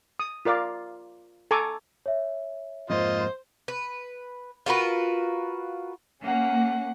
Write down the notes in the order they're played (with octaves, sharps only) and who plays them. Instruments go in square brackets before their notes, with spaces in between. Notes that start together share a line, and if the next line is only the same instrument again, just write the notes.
[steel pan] D#6
F4 A#4 D5 F5 D6
A4 G#5 A#5 C#6 D6
[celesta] C#5 E5
[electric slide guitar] F2 G#2 A#3 [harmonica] F4 D#5 [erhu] C5
[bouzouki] B4
F4 F#4 A#4 B4
[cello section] A#3 [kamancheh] C#4 F#5